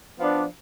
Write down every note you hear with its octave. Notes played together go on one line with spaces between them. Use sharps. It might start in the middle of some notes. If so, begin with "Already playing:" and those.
F3 B3 D4